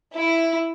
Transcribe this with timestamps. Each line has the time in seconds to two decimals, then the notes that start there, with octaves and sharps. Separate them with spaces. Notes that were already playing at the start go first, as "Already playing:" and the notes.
0.15 E4